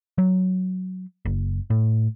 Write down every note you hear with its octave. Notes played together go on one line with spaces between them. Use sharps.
F#3
F#1
A2